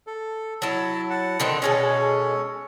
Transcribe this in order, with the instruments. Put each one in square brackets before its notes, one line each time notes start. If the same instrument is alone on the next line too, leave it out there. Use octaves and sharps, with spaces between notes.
[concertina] A4
[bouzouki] F#3 E4 [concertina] A5
[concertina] F#5 A5
[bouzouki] D3 D#3 C4
[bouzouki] B2 G#3 A4 [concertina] C#4 C#5